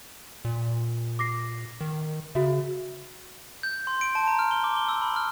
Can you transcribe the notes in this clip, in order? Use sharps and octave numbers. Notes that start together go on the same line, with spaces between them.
A#2
D6 A#6 C7
D#3
C#3 F#4 E5
G6
C6
D7
A5
A#5
F6
G7
D6
G7
E6
B5
F6